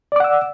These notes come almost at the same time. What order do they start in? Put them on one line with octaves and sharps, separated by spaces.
D5 D6 F#5 E6